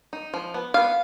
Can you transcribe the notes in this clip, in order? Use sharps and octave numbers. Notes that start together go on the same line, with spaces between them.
D#4
F3
B3
B3 F5